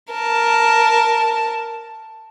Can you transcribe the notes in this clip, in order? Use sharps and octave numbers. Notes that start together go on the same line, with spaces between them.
A#4 A5